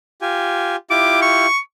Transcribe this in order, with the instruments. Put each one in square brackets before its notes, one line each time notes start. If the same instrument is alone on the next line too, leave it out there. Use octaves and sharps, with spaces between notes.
[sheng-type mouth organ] F4 G4 G#5
[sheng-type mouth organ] E4 F4 G4 [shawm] D6
[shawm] C#6